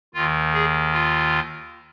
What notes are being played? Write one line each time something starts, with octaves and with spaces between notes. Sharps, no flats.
D#2 D#3 F4
G#4
F4